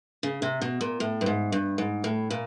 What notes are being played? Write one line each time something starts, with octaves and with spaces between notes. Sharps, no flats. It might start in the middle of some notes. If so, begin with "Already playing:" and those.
C#3
C3
B2
A#2
A2
G2
G#2
G2
G#2
A2
A#2